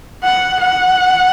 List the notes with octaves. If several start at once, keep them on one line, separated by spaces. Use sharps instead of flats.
F#5
F#5